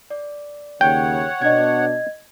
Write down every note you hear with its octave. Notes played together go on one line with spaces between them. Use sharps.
D5
D#2 C#3 C#5 F#5 G5
B2 D4 D#5 G#6